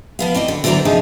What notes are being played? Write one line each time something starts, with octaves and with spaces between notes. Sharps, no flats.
F3 B3 F5
C4 E4 D5 D#5
D3
D3 E3 F#3 C5 D5 A#5
C3 F3 D4 D#4 G#4